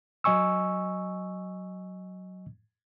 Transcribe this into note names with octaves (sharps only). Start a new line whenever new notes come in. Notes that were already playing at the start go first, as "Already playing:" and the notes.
F#3 D#5 G#5 C#6 E6